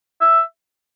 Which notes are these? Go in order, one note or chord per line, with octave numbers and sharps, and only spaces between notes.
E5